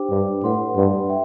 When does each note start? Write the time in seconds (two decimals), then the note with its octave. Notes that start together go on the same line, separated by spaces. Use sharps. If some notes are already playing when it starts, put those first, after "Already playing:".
Already playing: D4 G4 C5 G5 D6
0.10 G2
0.44 A2 B4 F#5 C6
0.76 G2
1.09 E5 G5